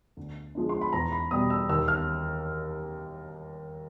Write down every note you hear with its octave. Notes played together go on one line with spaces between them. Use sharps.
D2
D3 F3 G#3
C6
B5
E2 A#5
B5
B2 G3 D#6
E6
D#2 E6
F6